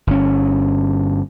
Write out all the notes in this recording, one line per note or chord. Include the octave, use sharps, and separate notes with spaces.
G1 C#4